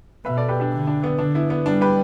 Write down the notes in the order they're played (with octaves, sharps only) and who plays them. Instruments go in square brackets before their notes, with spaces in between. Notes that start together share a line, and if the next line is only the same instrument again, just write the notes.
[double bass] B2 [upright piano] B4 E5
[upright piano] A4 D5
G4 B4
D4 G4
[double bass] D3
[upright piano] D4
B3
[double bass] D3 [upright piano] D4
[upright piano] B3 E4
B3
[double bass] G3 [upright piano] D4
[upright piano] G4 B4